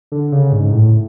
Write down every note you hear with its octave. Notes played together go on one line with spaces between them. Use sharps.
D3
C#3
G#2
A2